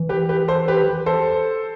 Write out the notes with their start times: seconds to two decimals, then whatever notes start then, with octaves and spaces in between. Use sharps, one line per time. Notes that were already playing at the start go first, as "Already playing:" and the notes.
Already playing: E3
0.09 G4 B4
0.29 G4 B4
0.48 A4 C5
0.68 G4 B4
1.06 A4 C5